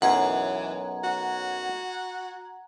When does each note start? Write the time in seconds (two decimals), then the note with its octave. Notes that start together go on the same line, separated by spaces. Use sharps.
0.02 B1 F#2 E3 F#5 A#5 G#6
1.04 F#4